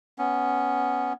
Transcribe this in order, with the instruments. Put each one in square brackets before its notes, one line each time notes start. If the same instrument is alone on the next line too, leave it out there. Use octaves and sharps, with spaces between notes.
[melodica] B3 C#4